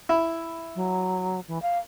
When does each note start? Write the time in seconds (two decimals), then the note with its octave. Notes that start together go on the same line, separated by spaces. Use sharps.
0.09 E4
0.76 F#3
1.48 E3
1.62 F5